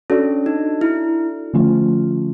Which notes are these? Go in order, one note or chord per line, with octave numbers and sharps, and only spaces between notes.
C#4 D4 F#4 A4 D5
D#4
E4
D3 F3 A3 C#4 F4